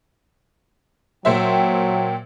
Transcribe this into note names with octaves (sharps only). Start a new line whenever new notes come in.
A#2 F#3 C5 E5 G5